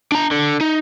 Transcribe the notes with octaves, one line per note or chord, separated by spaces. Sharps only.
D4 A#5
D3
D#4